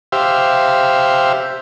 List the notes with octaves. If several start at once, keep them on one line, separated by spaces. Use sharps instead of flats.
G4 C5 E5 F5